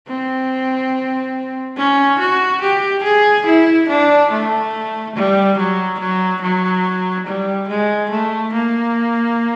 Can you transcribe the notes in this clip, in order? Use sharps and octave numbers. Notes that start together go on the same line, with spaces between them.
C4
C#4
F#4
G4
G#4
E4
D4
A3
G3
F#3
F#3
F#3
G3
G#3
A3
A#3